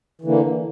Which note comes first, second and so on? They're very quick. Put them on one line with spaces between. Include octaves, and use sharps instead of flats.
E3 D3 A#3